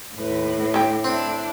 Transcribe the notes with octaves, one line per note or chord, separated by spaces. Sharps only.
D#2 A2 B4
D3 G4
C4 D4 E4